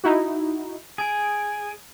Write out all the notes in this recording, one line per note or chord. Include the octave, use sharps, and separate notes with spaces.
D#4 E4 F#4
G#4 D7